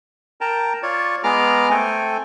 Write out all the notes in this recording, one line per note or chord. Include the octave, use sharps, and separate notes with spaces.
A#4 G5 A5 A#5
F4 C#5 D5
G#3 B3 G#4 A#5 D6 F6
A3 C4 A4 G5 G#5